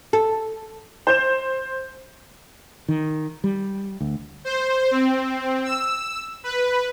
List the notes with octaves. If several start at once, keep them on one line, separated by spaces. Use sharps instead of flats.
A4
C5 G6 E7
D#3
G3
D2
C5
C4
E6
B4